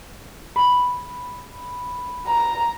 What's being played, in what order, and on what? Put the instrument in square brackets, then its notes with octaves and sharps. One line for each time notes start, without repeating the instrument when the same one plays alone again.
[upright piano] B5
[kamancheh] A#5